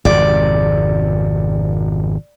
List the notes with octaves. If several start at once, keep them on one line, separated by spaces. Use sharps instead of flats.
G#1 F2 C3 D5